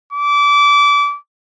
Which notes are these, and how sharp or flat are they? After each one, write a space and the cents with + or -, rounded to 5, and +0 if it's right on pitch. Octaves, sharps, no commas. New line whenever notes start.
D6 -25